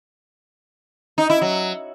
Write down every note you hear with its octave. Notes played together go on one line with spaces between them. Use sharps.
D#4
E4
F#3